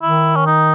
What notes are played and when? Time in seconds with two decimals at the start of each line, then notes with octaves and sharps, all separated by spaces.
0.02 D#3 E4
0.36 C#4
0.46 D#4